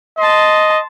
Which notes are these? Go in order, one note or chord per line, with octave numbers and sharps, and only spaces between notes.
D#5 A5 C6